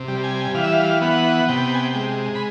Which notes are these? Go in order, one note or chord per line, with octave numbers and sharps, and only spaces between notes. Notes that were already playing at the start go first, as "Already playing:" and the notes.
Already playing: C3
G3
G#5
E3 F5
E5
F5
B3 F#5
C3 G5
G#5
G5
G#3
B5